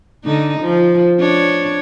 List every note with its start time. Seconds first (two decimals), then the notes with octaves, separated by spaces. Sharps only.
0.24 D3 D#4
0.61 F3
1.20 D4 C#5